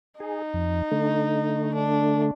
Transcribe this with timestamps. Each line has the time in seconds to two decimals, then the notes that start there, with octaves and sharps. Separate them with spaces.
0.20 D#4 G#4
0.54 F2
0.92 D3 A3
1.74 D4